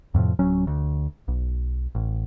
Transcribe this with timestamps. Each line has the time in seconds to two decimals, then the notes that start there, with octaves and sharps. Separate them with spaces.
0.14 F2 A2 C3 F3
0.39 D1 F#3 C#4
0.67 D2
1.28 B1
1.95 A1